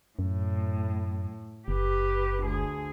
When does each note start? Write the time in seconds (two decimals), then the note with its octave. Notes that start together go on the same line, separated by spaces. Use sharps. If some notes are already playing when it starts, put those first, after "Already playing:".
0.19 F#2 A2
1.68 F#1 G4 B4
2.44 D2 G#4